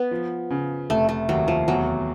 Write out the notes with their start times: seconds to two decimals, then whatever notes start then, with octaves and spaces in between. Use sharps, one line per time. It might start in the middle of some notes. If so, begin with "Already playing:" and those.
Already playing: B3
0.11 F3
0.50 C#3
0.90 F1 A3
1.09 A3
1.29 D#2 F#3
1.48 F3
1.68 E2 F#3